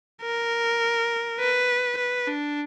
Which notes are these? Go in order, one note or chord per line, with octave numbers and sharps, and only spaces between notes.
A#4
B4
B4
D4